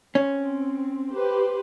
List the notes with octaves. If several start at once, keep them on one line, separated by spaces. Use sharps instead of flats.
C4 C#4
G4 B4 C5